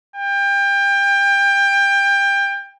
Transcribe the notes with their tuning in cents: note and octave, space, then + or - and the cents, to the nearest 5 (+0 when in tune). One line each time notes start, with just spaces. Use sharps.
G5 +25